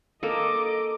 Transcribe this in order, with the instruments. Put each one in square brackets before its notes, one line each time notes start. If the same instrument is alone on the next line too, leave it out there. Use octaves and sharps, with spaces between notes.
[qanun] A#3 A4 [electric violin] D#5 D6